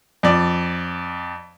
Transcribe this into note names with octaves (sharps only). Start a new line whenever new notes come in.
F2 D5